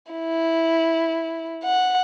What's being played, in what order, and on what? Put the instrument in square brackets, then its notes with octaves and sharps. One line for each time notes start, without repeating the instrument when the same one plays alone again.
[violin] E4
F#5